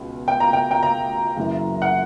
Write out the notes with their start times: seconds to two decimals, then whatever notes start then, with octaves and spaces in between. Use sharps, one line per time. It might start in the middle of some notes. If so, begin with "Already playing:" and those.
Already playing: C#2 B2
0.28 G5
0.40 A#5
0.53 G5
0.71 G5
0.83 A#5
1.37 F#1 F#2 E3
1.82 F#5